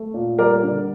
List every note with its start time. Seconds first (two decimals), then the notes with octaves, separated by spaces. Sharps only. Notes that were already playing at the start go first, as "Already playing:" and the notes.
Already playing: A3
0.14 A#2
0.39 G3 A#4 D5
0.63 D3